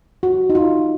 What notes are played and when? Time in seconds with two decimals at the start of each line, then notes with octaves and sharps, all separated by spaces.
0.23 F#4
0.50 D#4
0.55 F4